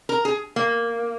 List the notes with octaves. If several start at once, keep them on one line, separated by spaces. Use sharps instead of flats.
A#4
G#4
A#3